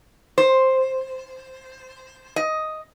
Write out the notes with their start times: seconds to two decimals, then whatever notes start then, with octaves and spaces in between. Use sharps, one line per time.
0.38 C5
2.36 D#5